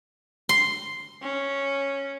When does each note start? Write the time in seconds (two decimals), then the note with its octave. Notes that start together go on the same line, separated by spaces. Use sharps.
0.49 C6
1.23 C#4